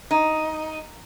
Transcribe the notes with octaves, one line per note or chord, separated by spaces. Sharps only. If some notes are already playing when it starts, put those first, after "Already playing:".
D#4